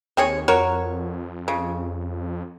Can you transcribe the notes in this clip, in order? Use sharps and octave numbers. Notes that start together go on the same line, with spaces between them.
D#2 C4 G#4 C#5
F2 F#4 A#4 C#5
C#3